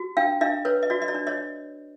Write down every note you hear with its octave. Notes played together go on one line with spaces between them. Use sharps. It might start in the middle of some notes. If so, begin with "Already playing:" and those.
Already playing: F#4
D4 F5 G5
D4 D#5 F5
B4 C#5
D#5
F#4 D5
D#5
D5
D4
C#5 D#5